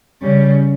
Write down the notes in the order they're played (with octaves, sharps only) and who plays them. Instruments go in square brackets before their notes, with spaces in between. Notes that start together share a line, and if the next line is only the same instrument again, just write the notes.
[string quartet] C#3 G3 C#4